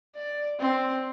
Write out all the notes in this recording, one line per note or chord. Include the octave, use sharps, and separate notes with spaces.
D5
C4